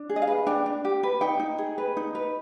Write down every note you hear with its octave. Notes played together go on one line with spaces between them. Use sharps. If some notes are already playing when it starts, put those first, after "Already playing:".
Already playing: D4
G#4
D#5
F5
B4
D4 G5
D4
G4
B4
D#4 G5
D#4
G#4
B4
D#4
B4